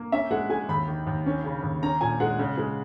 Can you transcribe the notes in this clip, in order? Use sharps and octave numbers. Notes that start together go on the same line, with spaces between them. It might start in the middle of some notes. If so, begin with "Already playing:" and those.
Already playing: A#3
C#4 E5
G#3 F#5
G#3 G#5
D#2 B5
D#3
D#2
C#4
C#3
D#2
C#4 A#5
A#2 G#5
G#3 F#5
C#3
G#3